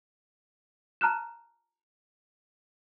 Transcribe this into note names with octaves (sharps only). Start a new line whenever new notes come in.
A5 A#5 F6 F#6 E7